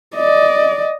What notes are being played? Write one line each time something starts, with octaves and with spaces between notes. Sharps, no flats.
D5 D#5